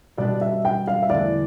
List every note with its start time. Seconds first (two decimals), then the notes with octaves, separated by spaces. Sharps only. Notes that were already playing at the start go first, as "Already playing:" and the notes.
0.17 B2 G3 D4 G4 B4 D5
0.41 E5
0.65 G5
0.88 F5
1.02 E5
1.10 E2 D3 A3 E4 B4 D5